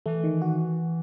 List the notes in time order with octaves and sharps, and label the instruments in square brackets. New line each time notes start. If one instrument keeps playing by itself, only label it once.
[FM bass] E3 [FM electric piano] A3
[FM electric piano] D#3
F#4